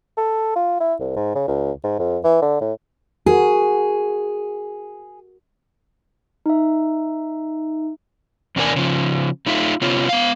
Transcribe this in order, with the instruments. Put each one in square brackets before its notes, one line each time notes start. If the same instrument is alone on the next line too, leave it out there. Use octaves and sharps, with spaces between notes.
[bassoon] A4
F4
E4
C2
G#2
C#3
C#2
G#2
F2
E3
D3
A2
[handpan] F#4 A#4 [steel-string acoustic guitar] G#4
[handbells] D#4 E5
[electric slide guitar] E2 C3 D4 E4 A#4 G#5
C#3 F3
A3 D#4 F4 E5
C3 B3 C#4 F4
B3 F5